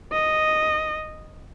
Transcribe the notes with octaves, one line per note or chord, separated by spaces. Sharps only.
D#5